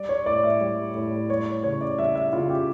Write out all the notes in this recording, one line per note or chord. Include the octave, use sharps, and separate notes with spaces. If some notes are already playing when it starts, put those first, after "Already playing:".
Already playing: G3 D5
C#5
A2 D5
E5
G3
A2
G3 C#5
C#3 C#5
D5
G3 E5
E5
C#3 F4
G4